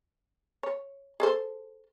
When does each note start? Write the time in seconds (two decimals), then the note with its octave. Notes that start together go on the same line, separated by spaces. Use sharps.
0.63 C#5
1.20 G#4 A4 C5